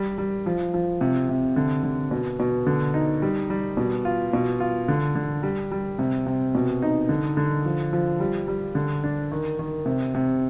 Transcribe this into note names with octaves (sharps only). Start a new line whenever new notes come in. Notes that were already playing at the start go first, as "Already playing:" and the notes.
Already playing: G3
G3
F3
F3
C3
C3
D3
D3
B2
B2
D3
D#4
G3
G3
B2
F4
B2
F4
D3
D3
G3
G3
C3
C3
B2
D#4
D3
D3
F3
F3
G3
G3
D3
D4
D#3
D#3
C3
C3